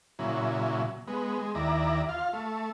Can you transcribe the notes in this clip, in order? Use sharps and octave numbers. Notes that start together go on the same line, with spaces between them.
A#2 C#3 F#3 E4
G#3 B3
G#3
D#2 E4 D5 A#5
F4 F5
A3